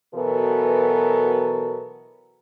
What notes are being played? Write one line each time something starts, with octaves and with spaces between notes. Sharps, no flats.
B2 E3 F#3 B3 A4 A#4